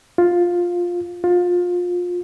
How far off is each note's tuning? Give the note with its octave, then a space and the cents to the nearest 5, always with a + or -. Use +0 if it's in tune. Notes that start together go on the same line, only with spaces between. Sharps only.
F4 +10
F4 +25